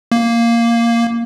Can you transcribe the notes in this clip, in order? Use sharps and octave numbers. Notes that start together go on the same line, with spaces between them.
A#3